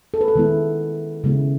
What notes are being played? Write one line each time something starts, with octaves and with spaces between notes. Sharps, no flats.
A4
B4
A4
D#3 G#3 B3 E4
C#3 G#3 B3 E4